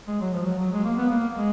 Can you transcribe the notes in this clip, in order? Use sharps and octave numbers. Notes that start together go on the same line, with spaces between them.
G#3
F#3
F3
F#3
F#3
G#3
A#3
B3
A#3
G#3